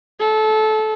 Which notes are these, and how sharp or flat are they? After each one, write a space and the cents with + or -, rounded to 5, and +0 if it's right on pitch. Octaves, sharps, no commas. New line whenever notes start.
A4 -25